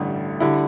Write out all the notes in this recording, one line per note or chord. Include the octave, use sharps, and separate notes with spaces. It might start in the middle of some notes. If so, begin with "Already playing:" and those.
Already playing: A1 G2 D3 A3 E4
D3 G3 E4